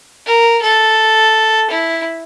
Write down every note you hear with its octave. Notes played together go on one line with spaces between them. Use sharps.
A#4
A4
E4